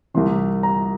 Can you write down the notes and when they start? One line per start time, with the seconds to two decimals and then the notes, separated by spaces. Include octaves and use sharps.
0.14 C2 C3 E3 C6
0.63 A#5